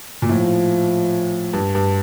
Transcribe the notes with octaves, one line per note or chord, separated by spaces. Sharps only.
A#2
A2 F3
G2
G2